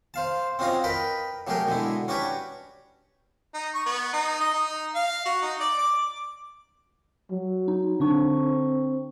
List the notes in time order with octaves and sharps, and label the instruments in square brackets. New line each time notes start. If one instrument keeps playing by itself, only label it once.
[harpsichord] C5 F5 A5
C4 C#4 F4 F#4 D#5 F5
A#4 B4 D#5 G5 B5
F#3 A3 G4 G#4 A#4 G5
B2 D3 G#3 E4
C#4 D4 F#4 G4 B4 C#5
[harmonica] D#4
C#6
B3
D#4
D#5
D#4
F5
F#4
D#4
D5
D6
[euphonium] F#3
[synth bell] D#4
[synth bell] D3 D4 C#6 [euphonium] C4